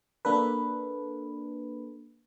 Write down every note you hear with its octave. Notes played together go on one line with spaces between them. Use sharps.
A#3 D4 A4 B4